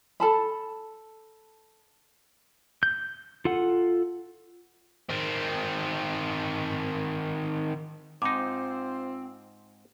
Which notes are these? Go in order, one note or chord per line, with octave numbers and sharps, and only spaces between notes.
A4 A5 B5
G6
F4 A4 F#5
D#3 C4
G#2 C4 D#4 F4 C5 D6